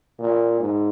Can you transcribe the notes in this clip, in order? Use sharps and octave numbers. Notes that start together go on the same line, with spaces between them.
A#2
G#2